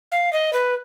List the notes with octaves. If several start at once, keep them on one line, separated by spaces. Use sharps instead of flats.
F5
D#5
B4